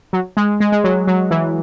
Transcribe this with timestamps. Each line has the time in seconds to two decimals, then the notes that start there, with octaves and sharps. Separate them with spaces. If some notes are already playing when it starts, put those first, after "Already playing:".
0.13 F#3
0.37 G#3
0.60 G#3
0.72 G#3
0.84 F#3
1.07 F#3
1.31 E3